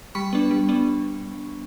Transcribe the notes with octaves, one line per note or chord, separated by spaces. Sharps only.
G3 B5 C#6
B3 D4
G3
B3 D4